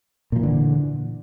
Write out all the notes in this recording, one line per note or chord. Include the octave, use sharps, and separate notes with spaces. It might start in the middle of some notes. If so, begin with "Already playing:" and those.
A#2 D3 E3 F3